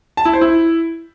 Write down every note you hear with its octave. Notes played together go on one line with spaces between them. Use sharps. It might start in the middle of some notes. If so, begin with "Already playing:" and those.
A5
E4
C5
E4